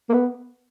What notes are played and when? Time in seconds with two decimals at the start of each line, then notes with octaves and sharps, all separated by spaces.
0.10 A#3
0.13 B3